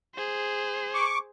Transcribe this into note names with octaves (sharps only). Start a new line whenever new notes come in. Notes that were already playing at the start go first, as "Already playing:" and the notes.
G#4 C5
C#6 D6